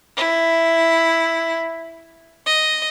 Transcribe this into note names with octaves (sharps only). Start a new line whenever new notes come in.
E4
D#5